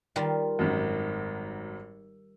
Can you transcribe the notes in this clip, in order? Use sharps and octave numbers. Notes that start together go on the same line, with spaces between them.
D#3 G3 F4
G#1 F#2